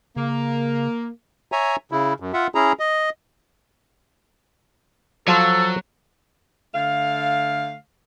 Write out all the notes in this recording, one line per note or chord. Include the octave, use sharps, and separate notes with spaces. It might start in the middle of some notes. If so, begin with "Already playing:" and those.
C#3 A#3
C#5 E5 G#5 A#5
C#3 E4
F#2
F4 E5 F#5
C#4 E4 G#4 A#5
D#5
F3 F#3 A4
D3 A3 F5